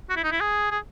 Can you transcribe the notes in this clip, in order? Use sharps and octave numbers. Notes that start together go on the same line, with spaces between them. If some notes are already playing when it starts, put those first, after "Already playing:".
F#4
E4
D#4
E4
G#4
G#4